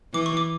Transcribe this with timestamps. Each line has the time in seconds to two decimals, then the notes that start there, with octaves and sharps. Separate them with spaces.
0.14 E3 D6
0.26 C#6
0.37 D6